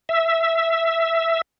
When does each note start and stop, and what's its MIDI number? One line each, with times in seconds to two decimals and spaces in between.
0.09 1.42 76